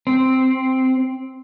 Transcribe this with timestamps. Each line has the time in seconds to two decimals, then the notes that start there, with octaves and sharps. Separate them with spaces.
0.07 C4